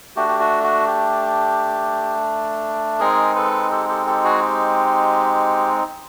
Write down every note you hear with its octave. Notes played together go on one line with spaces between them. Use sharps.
A3 D4 F#4 G4
G4
F#4
F#4
G4
G#3 C4 D#4 G#4 A#4
A4 B4
G4 A4
G4 A4
G4 A4
F#4 G#4
G4